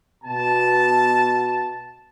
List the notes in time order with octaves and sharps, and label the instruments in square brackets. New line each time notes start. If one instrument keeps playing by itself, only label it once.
[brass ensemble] B2 A5